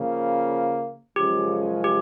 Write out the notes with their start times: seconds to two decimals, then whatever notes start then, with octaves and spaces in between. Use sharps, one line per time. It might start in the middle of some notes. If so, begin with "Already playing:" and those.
Already playing: C#3 F3 A#3
1.16 F#2 C#3 F3 G#3 C#4 G4
1.84 G4